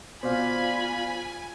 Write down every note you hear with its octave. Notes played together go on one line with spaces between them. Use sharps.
B2 F4 C5 D5 F5 G#5 B5